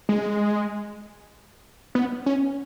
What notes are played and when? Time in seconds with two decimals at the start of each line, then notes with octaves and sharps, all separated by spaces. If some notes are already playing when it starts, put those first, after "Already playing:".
0.09 G#3
1.95 B3
2.26 C#4